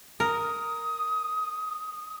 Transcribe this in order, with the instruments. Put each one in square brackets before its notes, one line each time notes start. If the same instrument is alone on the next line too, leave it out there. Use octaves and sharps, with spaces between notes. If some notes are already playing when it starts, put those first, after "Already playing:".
[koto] A#4 [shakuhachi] D#6